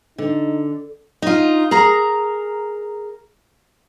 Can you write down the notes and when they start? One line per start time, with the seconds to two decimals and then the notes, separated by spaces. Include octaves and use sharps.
0.18 D3 D#4
1.22 D#4 F4
1.71 G#4 A#4 A#5